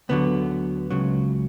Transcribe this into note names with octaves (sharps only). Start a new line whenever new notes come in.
D2 D3 F#3 B3
C#2 C#3 F#3